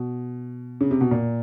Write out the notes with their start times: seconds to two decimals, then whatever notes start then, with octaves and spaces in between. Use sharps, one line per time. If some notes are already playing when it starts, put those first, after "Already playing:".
Already playing: B2
0.81 C#3
0.91 C3
1.01 B2
1.11 A#2